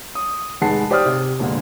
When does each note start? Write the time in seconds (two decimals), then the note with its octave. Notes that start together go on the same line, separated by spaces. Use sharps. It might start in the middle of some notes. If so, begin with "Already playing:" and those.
0.15 D#6
0.61 F1 D#3 G#3 F#5 A5 C7
0.91 G4 C5 D5 G5 D#6 F6
1.06 C3
1.39 E1 A#2 D3